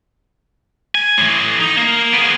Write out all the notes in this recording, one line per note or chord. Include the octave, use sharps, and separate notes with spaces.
G#5
A2 E3
D#4
A#3
B3 G#4